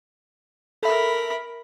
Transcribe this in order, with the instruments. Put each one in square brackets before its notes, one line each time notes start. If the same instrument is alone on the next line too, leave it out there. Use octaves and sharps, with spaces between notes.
[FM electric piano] A4 E5 [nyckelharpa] A#4 B5